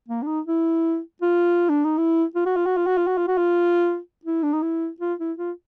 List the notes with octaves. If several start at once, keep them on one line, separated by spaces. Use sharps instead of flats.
A#3
D4
D#4
E4
F4
D4
D#4
E4
F4
F#4
F4
F#4
F4
F#4
F4
F#4
F4
F#4
F4
E4
D4
D#4
E4
F4
E4
F4